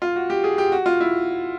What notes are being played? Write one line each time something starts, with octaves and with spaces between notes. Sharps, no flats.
F4
F#4
G4
G#4
G4
F#4
F4
E4